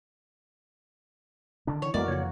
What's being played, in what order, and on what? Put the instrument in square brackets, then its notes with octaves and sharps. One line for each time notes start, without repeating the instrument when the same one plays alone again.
[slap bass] D3 D#3 D4
[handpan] E3 [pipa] C#5
[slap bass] F2 [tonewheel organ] G#3 A3 B3 [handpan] F#4 A#4 [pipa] D5
[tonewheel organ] C#3 C#5 [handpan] A#3 F#4